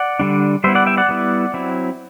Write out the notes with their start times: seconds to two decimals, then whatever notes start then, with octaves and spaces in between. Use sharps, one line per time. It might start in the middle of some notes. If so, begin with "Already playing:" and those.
Already playing: D5 F#5
0.19 D3 G3 D4
0.64 G3 B3 E4 C5 E5
0.75 D5 F#5
0.86 E5 G5
0.97 D5 F#5
1.09 G3 B3 E4
1.54 F#3 C4 E4